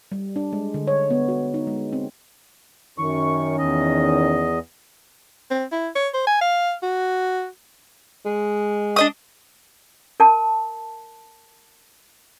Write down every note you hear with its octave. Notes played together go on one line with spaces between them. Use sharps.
G3
D4
G#3
D3
C#5
B3
F#4
D#4
G#3
C4
F#2 D#3 C#4 C#6
E2 D#5
C4
E4
C#5
C5
G#5
F5
F#4
G#3
D4 D#5 D#6
A#4 A5